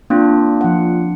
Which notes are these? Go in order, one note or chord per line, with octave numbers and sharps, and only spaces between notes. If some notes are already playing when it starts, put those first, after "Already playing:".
A#3 C4 D4 F4
F3 F#5